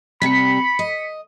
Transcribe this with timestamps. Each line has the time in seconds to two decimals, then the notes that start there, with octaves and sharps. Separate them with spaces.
0.22 C3 G3 B5 B6 C#7
0.79 D#5